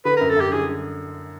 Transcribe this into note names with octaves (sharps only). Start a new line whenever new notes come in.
D3 B4
F#2 A#4
A4
F#2 G4
D3 G#4